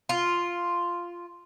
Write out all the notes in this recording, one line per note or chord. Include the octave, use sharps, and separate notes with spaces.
F4